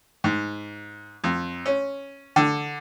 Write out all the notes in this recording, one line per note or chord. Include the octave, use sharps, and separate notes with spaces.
G#2
F2
C#4
D3